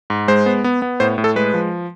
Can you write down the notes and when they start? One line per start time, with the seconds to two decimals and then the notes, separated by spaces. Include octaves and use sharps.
0.10 G#2
0.28 G#3 C5
0.46 B3
0.64 B3
0.82 B3
1.00 A2 C5
1.18 A2
1.24 A4
1.36 G#3 B4
1.54 F3